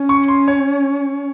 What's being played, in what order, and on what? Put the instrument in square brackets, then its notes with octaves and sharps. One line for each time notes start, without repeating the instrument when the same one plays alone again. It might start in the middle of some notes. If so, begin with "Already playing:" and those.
Already playing: [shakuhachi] C#4
[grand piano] C#6
C6
C#5